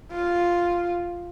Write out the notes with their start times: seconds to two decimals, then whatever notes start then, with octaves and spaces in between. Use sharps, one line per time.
0.11 F4